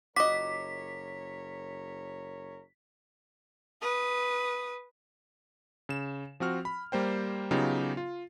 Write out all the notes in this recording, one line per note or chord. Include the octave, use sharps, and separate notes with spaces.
F#1 F4 F#4 A#4 C#5 D#5 D6 B6
B4 D#6
C#3 E7
F3 C4 F#4 F6
B5
G3 A#3 C5 G5
C#3 F#3 B3 D#4 F4 G4
F4